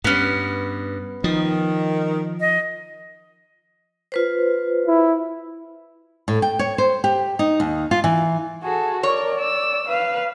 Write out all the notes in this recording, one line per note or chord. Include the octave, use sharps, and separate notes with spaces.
G2 B3 C#4
D#3 F3
D#5
F4 B4 C5
E4
A2
G5
C#5
C5
G4
D#4
D#2
F4
E3
F#4 G#4 A4
A#4 C#5 D5
E6
B4 F5